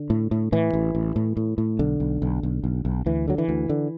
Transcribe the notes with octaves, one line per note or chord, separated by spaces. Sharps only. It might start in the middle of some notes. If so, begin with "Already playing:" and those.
Already playing: D3
A2
A2
A2 E3
A1
A1
A2
A2
A2
B1 D3
B1
B1
B1
B1
B1
D2 E3
D3 F#3
E3
D2
D3